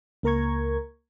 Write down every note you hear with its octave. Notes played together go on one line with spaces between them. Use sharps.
C#2 A#3 A#4 A#5 C#6 G#6